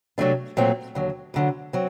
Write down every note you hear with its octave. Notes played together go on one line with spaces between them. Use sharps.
C3 F#3 A3 D4
A#2 F#3 A3 C4
D#2 D3 F#3
D2 D3 F#3
F#3 C4